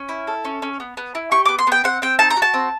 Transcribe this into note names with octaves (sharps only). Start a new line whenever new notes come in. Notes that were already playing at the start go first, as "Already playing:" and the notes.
Already playing: C#4
E4
A4
C#4
C#4
B3
B3
E4
G4 C#6
B3 D6
C6
B3 G5
C4 F#5
C4 G5
D#4 A5
A#5
F#4
A5
C4